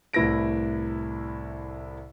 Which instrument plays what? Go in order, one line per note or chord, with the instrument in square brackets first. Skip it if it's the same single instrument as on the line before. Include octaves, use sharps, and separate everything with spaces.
[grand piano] C2 A2 E4 B4 A#6 D7